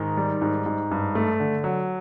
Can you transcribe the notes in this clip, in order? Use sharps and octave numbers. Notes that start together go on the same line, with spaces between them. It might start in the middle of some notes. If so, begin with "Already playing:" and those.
Already playing: G#2 D#3
G3
G#2
G#2
G2
A3
D3
F#3